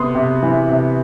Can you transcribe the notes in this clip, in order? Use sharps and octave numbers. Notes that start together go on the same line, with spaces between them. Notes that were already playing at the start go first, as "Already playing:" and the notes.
Already playing: C3 B3 C6 D#6
C3
E3
C3